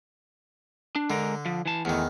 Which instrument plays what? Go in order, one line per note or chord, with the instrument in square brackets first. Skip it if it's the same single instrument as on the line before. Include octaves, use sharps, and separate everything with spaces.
[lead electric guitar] D4
[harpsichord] D3 [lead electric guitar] G#3 A#4
[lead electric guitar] F3
E3 A5
[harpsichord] E2 D#3 [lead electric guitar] A2 E3